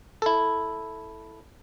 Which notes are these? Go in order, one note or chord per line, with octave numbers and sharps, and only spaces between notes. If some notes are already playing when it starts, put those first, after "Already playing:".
E4 A4